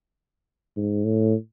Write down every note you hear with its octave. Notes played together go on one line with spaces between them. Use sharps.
G#2
A2